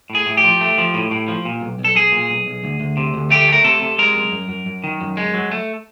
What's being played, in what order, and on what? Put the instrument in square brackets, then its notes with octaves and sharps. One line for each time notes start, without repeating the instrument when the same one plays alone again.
[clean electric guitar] A2
G#4
A2
G4
F3
A3
F3
A2
A2
F3
A#2
B1
B1
A4
B1 G#4
A#2
B1
B1
D2
D2
C3
D2
A3 G4
A3 A#4
C3 A4
C3
G#3 A#4
F#2
F#2
F#2
F#2
D#3
F#2
G#3
F#3
A3